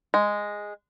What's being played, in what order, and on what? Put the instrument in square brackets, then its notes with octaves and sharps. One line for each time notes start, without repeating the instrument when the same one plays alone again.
[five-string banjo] G#3